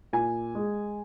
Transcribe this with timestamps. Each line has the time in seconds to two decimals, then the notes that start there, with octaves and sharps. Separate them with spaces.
0.13 A#2 G#5
0.55 G#3